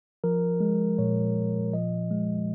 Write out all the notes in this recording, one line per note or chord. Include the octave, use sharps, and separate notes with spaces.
F3 A#4
G#3
A#2 C#5
A#2
F3 D#5
G#3